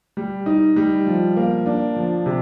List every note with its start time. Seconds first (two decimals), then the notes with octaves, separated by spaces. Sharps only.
0.17 G3
0.46 D#4
0.76 G3
1.07 F3
1.37 A#3
1.66 D4
1.96 F3
2.26 C3